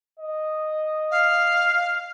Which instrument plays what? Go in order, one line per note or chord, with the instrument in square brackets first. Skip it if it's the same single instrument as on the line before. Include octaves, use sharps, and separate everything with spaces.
[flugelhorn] D#5
[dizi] F5